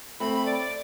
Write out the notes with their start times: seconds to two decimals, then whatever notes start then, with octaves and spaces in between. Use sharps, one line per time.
0.20 A3 C4 B5
0.34 B5
0.46 D5
0.59 D5